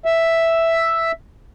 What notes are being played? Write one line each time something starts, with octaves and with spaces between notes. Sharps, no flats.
E5